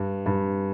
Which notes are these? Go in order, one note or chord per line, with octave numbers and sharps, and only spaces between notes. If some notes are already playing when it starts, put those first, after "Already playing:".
Already playing: G2
G2